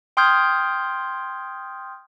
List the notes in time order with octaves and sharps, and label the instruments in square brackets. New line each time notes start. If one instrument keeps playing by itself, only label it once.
[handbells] G5 C6 D#6 F6 G6 G#6